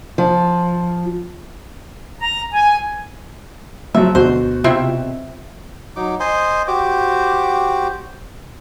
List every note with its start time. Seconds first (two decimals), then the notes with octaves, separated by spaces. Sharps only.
0.18 F3
2.20 A#5
2.51 G#5
3.94 F3 F#3 E5
4.15 D2 B2 F#4 C5
4.64 C3 C4 E4 F4 E5 G5
5.96 F#3 D#4 D6
6.20 C5 D#5 G#5 C6
6.68 F#4 G4 C5 D6